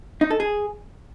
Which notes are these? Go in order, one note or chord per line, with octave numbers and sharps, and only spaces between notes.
D#4
A4
G#4